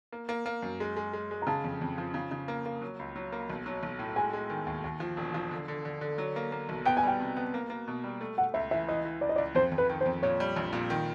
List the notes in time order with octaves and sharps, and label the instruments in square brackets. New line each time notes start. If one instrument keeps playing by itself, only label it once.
[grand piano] A#3
A#3
A#3
F#2
G#3
G#3
G#3
G#3
[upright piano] A#5
[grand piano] C#3 [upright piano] A5
[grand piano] F2
F2
F3
C#3
C#3
A#3
A#3
F#3
C#2
F#3
A#3
B1
F#3
B1
A2
[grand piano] G#3 [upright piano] G#5
[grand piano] G#3
D#3
D#2
D#2
F3
E1
F3
D3
D3
D3
D3
F#3
A#3
A#3
B1
[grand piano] B3 [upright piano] G5
[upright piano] G#5
[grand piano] G3 [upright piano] G5
[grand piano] C3
B3
A#3
A#3
B2
G3
A3
[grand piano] A3 [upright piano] F#5
[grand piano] C#2 [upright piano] E5
[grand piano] E3 [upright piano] E5
[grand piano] E3 [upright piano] D#5
[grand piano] E3
[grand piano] C#2 [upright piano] D5
[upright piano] D#5
[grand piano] C#2 [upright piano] D5
[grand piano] F2 [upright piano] C5
[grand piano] F2
[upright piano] B4
[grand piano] D#3
[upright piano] C5
[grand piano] F2
[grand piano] A#2 [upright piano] C#5
[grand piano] G3
A#1
A#2
D#3